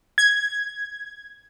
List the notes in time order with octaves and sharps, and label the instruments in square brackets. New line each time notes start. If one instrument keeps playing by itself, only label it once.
[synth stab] G#6